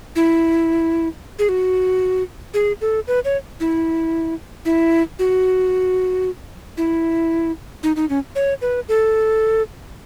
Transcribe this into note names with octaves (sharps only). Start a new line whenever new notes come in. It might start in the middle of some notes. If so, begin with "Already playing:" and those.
E4
G#4
F#4
G#4
A4
B4
C#5
E4
E4
F#4
E4
D#4
D#4
C#4
C#5
B4
A4